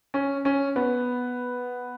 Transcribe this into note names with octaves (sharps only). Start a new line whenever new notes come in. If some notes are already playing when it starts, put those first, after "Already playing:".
C#4
C#4
B3